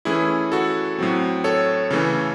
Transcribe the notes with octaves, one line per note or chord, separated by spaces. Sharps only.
E3 A3 C#4 E4 G#4
F#4 A4
A2 F#3 C4
A4 C#5
C#3 E3 A3 C#4